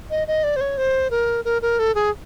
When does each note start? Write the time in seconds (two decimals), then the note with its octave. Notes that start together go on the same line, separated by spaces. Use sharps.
0.10 D#5
0.28 D#5
0.44 D5
0.56 C5
0.61 C#5
0.77 C5
1.11 A#4
1.45 A#4
1.62 A#4
1.79 A4
1.95 G#4